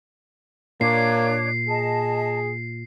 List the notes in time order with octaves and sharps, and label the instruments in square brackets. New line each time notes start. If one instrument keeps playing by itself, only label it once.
[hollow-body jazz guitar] A#2 [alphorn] A#3 [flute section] D4 C#5 [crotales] C7
[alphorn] G#4 [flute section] D#5 A5